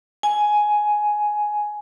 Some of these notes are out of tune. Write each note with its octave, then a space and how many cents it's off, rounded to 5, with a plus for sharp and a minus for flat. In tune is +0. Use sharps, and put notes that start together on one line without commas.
G#5 +10